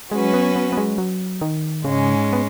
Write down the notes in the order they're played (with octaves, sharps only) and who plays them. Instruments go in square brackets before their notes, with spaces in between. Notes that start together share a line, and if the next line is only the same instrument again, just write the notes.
[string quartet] F#3 C#4 F#4 B4 [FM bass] G#3
[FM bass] B3
B3
B3
G#3
F#3
D#3
[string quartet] G#2 G#3 C#4 [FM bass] C#3
[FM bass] B3